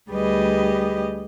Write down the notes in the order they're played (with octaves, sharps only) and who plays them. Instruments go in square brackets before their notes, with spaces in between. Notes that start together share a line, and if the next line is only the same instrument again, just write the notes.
[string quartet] D2 G3 G4 G#4 B4 D#5